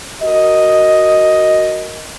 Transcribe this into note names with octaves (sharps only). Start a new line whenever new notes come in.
F#4 A#4 D#5